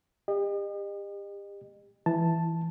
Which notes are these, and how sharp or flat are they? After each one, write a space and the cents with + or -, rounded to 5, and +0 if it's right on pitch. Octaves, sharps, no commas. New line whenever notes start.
G4 +35 D#5 -40
E3 +5 A5 +0